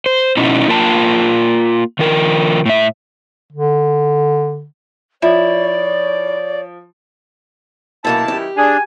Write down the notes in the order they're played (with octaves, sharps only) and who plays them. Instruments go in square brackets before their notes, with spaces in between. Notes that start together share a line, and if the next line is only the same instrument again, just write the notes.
[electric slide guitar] C5
B2 C#4 D#4 E4
A#3 F4 A#4 G5 A5
D#3 F3 A#4
A2 E5
[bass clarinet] D3
[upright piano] F3 [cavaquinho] E4 [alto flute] C#5 [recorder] D5
[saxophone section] F#2 D#3 E4 [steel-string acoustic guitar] B2 A#3 A4 [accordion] A5
[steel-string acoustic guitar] G4
[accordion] D4 [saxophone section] G#4 [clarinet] G#5